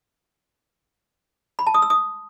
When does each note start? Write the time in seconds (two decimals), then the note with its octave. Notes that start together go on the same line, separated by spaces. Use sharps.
1.59 B5
1.67 A5
1.74 D#6
1.82 E6
1.90 D#6